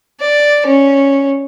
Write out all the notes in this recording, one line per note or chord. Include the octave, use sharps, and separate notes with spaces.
D5
C#4